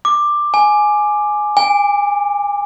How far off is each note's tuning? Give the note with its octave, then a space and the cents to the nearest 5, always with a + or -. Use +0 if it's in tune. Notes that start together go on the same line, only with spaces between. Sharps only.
D6 +10
G#5 +10
G#5 -35